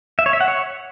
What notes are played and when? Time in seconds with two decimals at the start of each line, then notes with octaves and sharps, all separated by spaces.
0.19 E5
0.26 C#5
0.33 E5
0.40 F#5
0.48 C#5